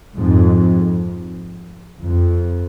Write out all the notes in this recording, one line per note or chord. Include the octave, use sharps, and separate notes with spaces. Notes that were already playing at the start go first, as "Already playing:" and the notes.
F2 G#2
F2